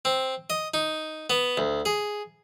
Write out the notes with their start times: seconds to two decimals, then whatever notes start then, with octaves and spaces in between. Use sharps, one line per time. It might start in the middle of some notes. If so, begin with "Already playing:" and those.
0.05 C4
0.50 D#5
0.74 D#4
1.30 B3
1.57 D2
1.85 G#4